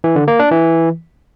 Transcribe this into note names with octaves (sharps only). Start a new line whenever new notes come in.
E3
D3
A#3
D4
E3